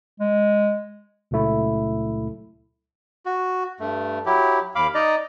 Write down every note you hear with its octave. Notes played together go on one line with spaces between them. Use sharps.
G#3
C#2 A#2 F#3 A3 E4
F#4
G2 A3
F#3 E4 G4
D#2 F5 B5 D6
D#4 D5 D#5 A#5